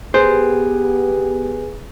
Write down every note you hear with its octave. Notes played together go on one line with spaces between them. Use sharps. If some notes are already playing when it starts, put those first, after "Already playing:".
B3 G4 G#4 B4 C5 G#5